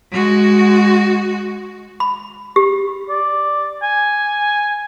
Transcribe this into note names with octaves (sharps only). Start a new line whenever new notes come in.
G#3 F#4
B5
G4
D5
G#5